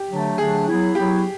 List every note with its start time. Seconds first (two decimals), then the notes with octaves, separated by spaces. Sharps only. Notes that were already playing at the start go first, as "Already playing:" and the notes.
Already playing: G4
0.09 D3 F#3 A3 D4
0.37 D3 F#3 A3 D4 G#4
0.67 F#3 B3 E4
0.95 F#3 B3 E4 G4